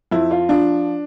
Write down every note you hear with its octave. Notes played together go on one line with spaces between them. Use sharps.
F2 E4
F4
F3 D4